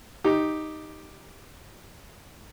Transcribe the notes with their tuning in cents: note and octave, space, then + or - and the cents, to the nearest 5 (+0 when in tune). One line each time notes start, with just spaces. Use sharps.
D#4 +0 G4 +0